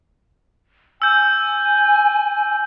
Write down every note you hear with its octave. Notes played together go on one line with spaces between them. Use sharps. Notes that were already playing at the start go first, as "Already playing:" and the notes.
G#5 E6 G6